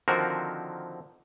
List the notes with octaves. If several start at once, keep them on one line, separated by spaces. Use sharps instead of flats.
D3 D#3 F3 C4 F#4 A#4